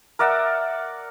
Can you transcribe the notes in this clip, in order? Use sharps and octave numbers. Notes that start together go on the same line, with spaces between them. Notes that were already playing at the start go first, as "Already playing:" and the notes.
A#4 D5 E5 F#5